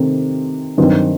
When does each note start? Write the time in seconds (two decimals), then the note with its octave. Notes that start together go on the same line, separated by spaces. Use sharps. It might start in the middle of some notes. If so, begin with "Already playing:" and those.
Already playing: C3 D#3 A3 C4
0.78 G2 D#3 F#3 C4 D#4